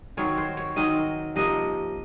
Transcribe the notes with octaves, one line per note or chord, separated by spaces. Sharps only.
D#3 F#3 C4 C#5
C5
C#5
D#3 F#3 C4 D#5
C3 F3 A#3 D#5